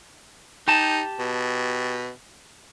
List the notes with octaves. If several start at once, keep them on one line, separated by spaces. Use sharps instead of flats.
D#4 G4 A5
B2